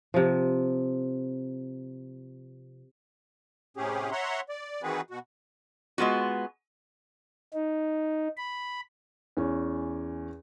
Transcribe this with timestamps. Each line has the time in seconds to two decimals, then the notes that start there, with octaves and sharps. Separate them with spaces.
0.14 C3 F3
3.77 A2 C3 C#4 G4 G#4
4.12 C#5 E5 F#5 A#5 C6
4.49 D5
4.83 D#3 E3 C4 F#4 G#4 B4
5.10 B2 F#4
5.98 G#3 B3 F4 F#4
7.54 D#4
8.37 B5
9.37 E2 C#4